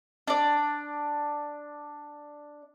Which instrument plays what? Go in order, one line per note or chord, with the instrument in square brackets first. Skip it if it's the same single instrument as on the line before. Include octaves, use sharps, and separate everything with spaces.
[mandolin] D4 D5